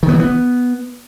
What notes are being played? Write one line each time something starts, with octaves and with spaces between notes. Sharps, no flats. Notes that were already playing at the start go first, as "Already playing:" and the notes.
D#3
B3
E3
B3